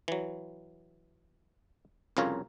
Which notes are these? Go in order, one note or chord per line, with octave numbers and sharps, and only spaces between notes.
E3 F#3
C2 F2 C#3 F4 A#4 C#5